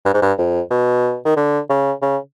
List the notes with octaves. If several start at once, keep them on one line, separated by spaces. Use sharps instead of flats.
G2
G#2
G2
F2
B2
D#3
D3
C#3
C#3